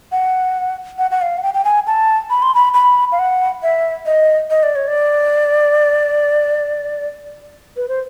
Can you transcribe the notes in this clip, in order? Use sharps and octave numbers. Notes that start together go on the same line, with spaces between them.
F#5
F#5
F#5
F5
F#5
G5
G5
G#5
A5
B5
C6
B5
B5
F5
F#5
E5
D#5
D#5
D5
C#5
D5
B4
C5